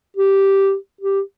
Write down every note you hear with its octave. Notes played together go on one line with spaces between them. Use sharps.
G4
G4